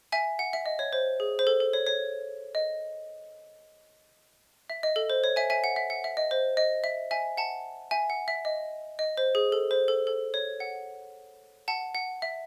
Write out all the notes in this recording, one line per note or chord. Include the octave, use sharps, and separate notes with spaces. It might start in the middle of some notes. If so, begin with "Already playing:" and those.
E5 G#5
F#5
E5
D#5
C#5
C5
G#4
C5
A4
A4
C#5
C#5
D#5
E5
D#5
A4
C5
C#5
E5 G#5
E5 G#5
F#5
E5
F#5
E5
D#5
C5
D#5
E5
E5 G#5
F#5 A5
E5 G#5
F#5
E5
D#5
D#5
C5
G#4
A4
C5
A4
A4
C#5
F#5
F#5 A5
F#5
E5